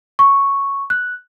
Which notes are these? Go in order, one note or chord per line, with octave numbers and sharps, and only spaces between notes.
C#6
F#6